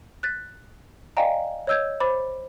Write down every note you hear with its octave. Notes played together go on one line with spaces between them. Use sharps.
F#6 A6 B6
D5 D#5 F5 G5 G#5 A#5
C#5 D#5 E6 G6 G#6
C5 B5 D6 A6